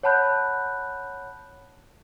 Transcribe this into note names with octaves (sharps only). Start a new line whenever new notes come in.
C#5 F#5 A5 B5 F#6 G6